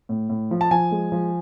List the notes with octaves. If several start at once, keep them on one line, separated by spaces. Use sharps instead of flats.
A2
A2
F3
A5
F3 G#5
G#3
F3